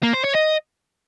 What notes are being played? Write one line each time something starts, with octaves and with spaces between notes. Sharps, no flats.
A#3
C5
C#5
D#5